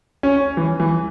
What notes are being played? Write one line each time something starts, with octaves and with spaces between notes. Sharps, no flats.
C#4
E3
E3